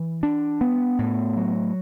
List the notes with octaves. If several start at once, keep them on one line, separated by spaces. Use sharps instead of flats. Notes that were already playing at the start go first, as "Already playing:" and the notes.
Already playing: E3
D4
B3
A2
F#3